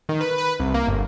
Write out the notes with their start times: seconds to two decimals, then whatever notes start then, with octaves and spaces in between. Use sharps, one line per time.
0.09 D#3
0.21 B4
0.38 B4
0.60 C2
0.74 A#3
0.87 G1